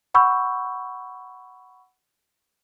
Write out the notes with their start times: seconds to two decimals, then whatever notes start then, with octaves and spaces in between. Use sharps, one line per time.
0.14 F#5 B5 C#6 E6 G6